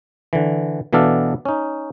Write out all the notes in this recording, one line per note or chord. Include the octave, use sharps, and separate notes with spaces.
D3 E3
B2 E3 B3 D4 A4 F5
C#4 D#4